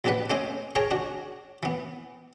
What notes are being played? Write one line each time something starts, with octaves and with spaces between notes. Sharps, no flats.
A#1 B2 D4 G4 B4 F#5
A3 C4 C#4 C5 C#5 D#5
G#4 A#4 C#5 G5 A5 A#5
D4 F#4
E3 B3